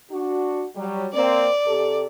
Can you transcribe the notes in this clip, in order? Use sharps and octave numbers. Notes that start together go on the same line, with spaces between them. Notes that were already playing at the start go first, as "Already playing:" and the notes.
D4 F#4
F#3 G3
A#3 C4 D5
C3 G4 A4